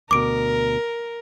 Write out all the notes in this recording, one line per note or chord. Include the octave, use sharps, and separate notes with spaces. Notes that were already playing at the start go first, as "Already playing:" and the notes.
D2 B2 A#4 D6 D7